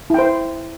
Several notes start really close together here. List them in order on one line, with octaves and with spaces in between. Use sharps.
E4 G5 C5